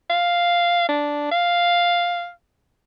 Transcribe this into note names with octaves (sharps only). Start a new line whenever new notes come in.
F5
D4
F5